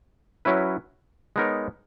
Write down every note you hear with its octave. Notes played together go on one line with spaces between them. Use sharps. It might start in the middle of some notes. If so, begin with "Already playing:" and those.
F#3 C#4 E4 B4
G#3 B3 D#4 A#4 C#5